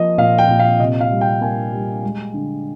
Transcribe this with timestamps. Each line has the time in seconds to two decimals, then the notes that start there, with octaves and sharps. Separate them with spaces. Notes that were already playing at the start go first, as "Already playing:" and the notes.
Already playing: F3 A#3 D#5
0.18 A#2 F5
0.38 G5
0.49 A#2
0.59 F5
0.80 C3 D#5
1.01 F5
1.11 G3
1.21 G5
1.41 A#3 G#5
1.72 G3
2.04 G#3
2.34 D3